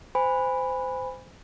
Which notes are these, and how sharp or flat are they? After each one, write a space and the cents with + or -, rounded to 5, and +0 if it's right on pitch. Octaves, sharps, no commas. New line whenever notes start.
C5 -25 G#5 -20 B5 +0